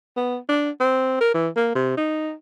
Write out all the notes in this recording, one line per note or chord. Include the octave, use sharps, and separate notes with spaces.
B3
D4
C4
A#4
E3
A#3
C3
D#4